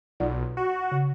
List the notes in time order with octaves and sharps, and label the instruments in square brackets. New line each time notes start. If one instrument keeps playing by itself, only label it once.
[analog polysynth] B1 [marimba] F4 D5 F#5
[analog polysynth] F#4
[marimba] C#3